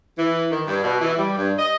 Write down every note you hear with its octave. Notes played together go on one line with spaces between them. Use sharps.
E3
D#3
G2
B2
E3
G3
G2
D#5